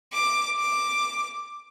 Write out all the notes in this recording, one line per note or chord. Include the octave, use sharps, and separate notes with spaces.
D6
D6